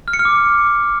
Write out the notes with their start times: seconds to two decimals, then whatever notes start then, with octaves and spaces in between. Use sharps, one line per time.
0.08 F6
0.13 C#7
0.19 F6
0.25 D6